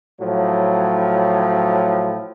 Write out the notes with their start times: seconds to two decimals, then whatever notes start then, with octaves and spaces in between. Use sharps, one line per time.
0.20 A2 F3 F#3